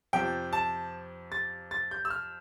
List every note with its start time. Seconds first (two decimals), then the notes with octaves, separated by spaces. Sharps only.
0.13 F2 C3 F3 G5
0.53 A5
1.32 A6
1.71 A6
1.91 G6
2.05 E6
2.10 F6